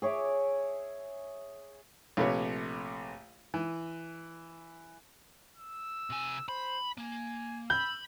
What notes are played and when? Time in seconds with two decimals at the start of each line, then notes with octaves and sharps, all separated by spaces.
0.02 G#4 C#5 E5 D6
2.17 A#1 C3 A3 B4 C#5
3.54 E3
5.57 E6
6.10 C3 G#5
6.49 C5 B5
6.97 A#3 G#5
7.70 B5 E6 G6